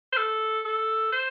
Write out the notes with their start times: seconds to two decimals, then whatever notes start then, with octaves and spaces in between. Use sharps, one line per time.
0.12 C5
0.17 A4
0.65 A4
1.12 C5